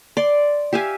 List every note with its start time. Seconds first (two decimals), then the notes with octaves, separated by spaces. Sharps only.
0.17 D5 C6
0.73 G4 E5 F5 G#5